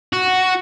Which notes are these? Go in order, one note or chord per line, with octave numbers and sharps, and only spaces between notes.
F#4